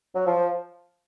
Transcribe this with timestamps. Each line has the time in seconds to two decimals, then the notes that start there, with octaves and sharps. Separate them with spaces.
0.15 F#3
0.26 F3